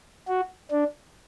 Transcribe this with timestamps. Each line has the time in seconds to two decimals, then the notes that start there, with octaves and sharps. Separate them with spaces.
0.28 F#4
0.71 D4